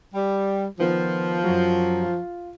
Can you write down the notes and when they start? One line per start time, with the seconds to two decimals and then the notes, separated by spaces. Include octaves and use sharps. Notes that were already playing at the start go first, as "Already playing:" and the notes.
0.14 G3
0.80 D#3 F3 B3 F4
1.44 F#2 F#3
2.02 F4